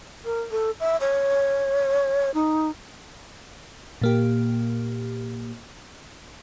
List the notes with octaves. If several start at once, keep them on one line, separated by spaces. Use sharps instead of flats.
A#4
A4
E5
C#5
D#4
A#2 A#3 G4